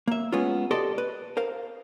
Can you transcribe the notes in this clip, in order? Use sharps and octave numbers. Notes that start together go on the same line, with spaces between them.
A#3 E5
G#3 B3 C#4 F4
F#4 G4 A4 D5 D#5 C6
B4
A#4 C5 F5